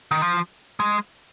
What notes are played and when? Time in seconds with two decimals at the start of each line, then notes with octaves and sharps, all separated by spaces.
0.11 D#3
0.22 F3
0.80 G#3